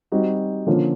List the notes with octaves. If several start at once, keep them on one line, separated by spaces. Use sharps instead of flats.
G3 C4 D#4 F#4
D3 F3 A#3 C#4 F4